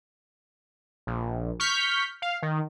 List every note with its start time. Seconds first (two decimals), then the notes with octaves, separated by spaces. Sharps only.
1.07 A#1
1.60 C#6 F6 G6 B6
2.22 F5
2.42 D#3